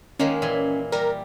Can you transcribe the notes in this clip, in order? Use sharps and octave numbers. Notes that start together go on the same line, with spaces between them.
D#3 G#3 A#3 C#4
A#2 E3 G#5
G3 A#4